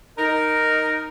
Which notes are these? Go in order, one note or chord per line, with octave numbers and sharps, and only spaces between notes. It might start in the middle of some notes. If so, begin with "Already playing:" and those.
D#4 A#4